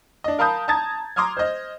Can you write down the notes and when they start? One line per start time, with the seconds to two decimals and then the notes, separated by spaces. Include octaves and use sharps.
0.24 D4 D#5
0.39 A#4 F5 A5 B5 D#6 G6
0.68 A5 A#5 D#6 G#6 A6
1.16 A#5 C6 D6 D#6 F6 G#6
1.37 C5 D#5